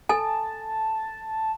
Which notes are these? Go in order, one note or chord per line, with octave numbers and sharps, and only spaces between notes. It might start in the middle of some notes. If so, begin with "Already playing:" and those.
A4 G#5 A5